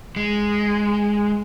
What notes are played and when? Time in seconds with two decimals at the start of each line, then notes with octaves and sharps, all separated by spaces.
0.16 G#3